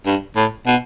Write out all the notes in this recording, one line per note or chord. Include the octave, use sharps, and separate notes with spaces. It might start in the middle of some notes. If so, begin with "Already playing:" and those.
G2
A2
B2